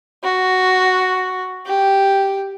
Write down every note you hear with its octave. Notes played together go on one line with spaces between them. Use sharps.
F#4
G4